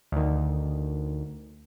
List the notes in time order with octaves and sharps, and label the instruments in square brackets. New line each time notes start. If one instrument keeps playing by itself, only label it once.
[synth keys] D2 D#3